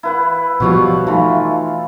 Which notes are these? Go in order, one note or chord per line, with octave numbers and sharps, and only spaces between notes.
E4 B4 F#5
B2 F3 G3 F#4 C#5 F#5
E3 A3 D#4 F4